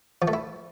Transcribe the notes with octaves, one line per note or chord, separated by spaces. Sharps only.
F3
A3
E4